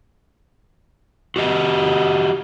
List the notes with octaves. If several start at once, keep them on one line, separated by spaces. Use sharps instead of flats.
F#4 G4 D#5 F#5